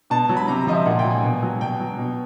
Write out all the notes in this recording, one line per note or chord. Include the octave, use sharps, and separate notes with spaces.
B2 A5
F#3
B5
C3 A#5
A#5
F3 D#5
E5
A#2 F#5
G5
F#3
G#5
B2
F#3
B2 G5
F#3
B2